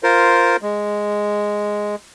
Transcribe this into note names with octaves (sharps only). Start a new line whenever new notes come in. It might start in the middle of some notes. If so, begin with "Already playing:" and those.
F4 A#4 C5
G#3